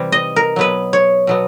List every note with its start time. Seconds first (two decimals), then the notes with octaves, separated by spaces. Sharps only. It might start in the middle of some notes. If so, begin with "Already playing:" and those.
Already playing: C3 E3 G3
0.12 D#5
0.36 A#4
0.56 B2 F#3 B3 B4
0.93 C#5
1.27 B2 F#3 B3